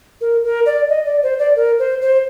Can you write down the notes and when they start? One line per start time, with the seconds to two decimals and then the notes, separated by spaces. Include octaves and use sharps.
0.21 A#4
0.44 A#4
0.66 D5
0.89 D#5
1.05 D5
1.23 C5
1.39 D5
1.56 A#4
1.79 C5
2.02 C5